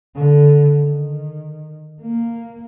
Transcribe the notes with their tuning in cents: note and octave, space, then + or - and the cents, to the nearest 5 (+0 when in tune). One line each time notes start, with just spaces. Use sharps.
D3 -10
D#3 -20
A#3 -5